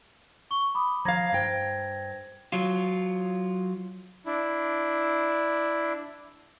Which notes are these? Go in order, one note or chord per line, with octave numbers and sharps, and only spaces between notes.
C#6 G7
B5 D6 D#6
F3 F5 A#5 G#6 A#6
G2 C5 G5 G#6 A#6
F#3 F4
D4 E4